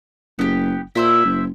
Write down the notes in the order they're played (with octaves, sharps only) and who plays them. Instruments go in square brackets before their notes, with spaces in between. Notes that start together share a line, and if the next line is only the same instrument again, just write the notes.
[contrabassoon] F#1 [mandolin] B3 G4
[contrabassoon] A#2 [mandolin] E4 C5 E5
[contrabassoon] F#1